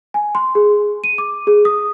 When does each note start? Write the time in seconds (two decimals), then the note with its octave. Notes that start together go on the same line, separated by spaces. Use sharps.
0.14 G#5
0.35 C6
0.55 G#4
1.04 D#7
1.18 D6
1.47 G#4
1.65 D#6